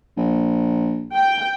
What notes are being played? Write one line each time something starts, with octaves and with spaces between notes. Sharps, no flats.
A#1
G5